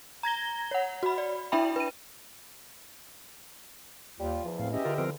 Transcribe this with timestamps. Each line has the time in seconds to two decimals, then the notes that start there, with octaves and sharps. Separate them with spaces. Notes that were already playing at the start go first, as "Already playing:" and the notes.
0.23 A#5 G#6 A#6 G7
0.71 C#5 F#5
1.03 F#4 B5
1.18 D5
1.52 D4 E4 E5 G5 B5
1.76 B4 D#7
4.20 D#2 G3 F4
4.45 E2 F3
4.59 D#2 A2 C4 F5
4.72 C#4 G4 D#5 E5
4.85 D3 F4 A#4
4.98 F3 C4 A#4